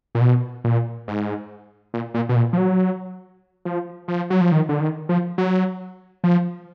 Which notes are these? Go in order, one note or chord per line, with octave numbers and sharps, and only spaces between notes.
A#2
B2
A#2
G#2
A#2
A#2
B2
A#2
F3
F#3
F3
F3
F#3
F3
D#3
D3
D#3
F3
F#3
F3